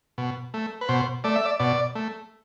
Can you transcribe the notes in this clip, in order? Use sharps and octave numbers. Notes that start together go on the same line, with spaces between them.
B2
A3
B4
B2 C5
A3 D5
E5
D5
B2 D5
A3